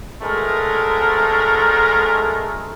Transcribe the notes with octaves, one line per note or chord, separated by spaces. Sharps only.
D2 G#3 A3 A4 A#4